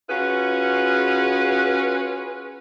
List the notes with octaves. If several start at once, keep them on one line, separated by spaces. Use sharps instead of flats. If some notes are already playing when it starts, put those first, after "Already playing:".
C#4 F4 F#4 G#4 B4